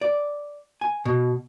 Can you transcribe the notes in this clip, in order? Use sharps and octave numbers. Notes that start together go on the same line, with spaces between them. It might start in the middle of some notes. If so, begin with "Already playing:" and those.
D5
G#5
B2